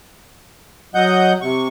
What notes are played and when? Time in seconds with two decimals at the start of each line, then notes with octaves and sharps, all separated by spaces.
0.95 F#3 D#5 F#5 G6
1.42 C3 C#6